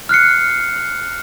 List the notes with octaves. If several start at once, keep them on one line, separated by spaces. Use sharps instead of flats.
F6 F#6 C7 C#7